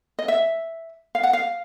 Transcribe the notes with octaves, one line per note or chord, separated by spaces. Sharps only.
D#5
E5
F5
F#5
F5